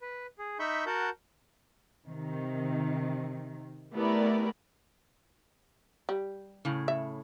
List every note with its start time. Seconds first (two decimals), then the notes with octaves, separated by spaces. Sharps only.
0.01 B4
0.39 G#4
0.60 D#4 E5 B5 C#6 G6
0.86 F#4 A#4 F#5 A5 G6
2.06 C3 D#3
3.93 A3 B3 E4 G4 A#4 D5
6.09 G3
6.65 A2 C#3
6.88 E5